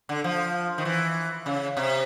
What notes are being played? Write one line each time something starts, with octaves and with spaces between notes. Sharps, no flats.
D3
F3
D#3
E3
C#3
C3